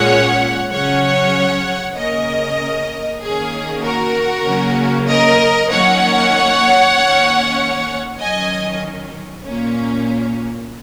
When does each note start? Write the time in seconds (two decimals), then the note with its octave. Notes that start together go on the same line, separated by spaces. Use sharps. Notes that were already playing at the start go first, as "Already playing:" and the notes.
Already playing: A#2 G#3 C#4 C#5 F#5
0.72 C#3 F#3 C#4 C#5 F#5
1.96 C#3 A#3 C#4 A#4 D#5
3.21 D#3 A#3 C#4 G#4
3.84 F#4 A#4
4.46 C#3 F#3 A#3 C#4
5.08 A#4 D#5
5.71 D#3 F#3 A#3 C#4 C#5 F#5
6.96 D#3 A#3 C#4
8.20 D#3 F#3 C#4 D#5 G#5
9.45 A#2 A#3 C#4